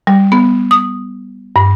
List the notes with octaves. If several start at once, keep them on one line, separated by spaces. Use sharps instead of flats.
G3
B3
D#6
G2